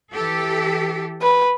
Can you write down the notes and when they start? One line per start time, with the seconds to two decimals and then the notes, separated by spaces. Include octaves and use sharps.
0.12 E3 G4 A4
1.22 B4